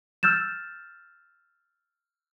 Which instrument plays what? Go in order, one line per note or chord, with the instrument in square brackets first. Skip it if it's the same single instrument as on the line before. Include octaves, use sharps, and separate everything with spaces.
[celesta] E6 F6 G6 A6 E7